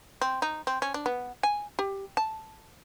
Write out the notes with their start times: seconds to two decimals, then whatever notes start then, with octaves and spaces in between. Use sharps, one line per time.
0.21 C4
0.42 D#4
0.67 C4
0.82 C#4
0.94 D4
1.06 B3
1.43 G#5
1.79 G4
2.17 A5